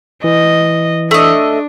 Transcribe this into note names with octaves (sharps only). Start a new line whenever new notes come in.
E3 D#5
A3 D4 D#5